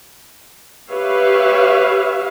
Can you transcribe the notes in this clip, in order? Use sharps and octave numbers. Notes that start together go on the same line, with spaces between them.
G4 B4 C#5 E5 F5